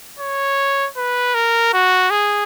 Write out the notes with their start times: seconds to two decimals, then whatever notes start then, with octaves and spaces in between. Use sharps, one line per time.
0.19 C#5
0.97 B4
1.34 A#4
1.73 F#4
2.10 G#4